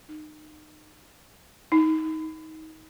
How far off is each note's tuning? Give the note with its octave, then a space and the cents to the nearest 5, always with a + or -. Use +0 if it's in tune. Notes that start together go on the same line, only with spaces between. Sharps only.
D#4 -30
D#4 +25